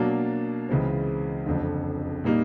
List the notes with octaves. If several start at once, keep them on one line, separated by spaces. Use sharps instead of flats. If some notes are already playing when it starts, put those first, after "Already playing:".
Already playing: B2 F#3 A#3 D4
C#2 C#3 E3 G#3 C4
F#1 F2 D3
A#2 G3 A#3 D#4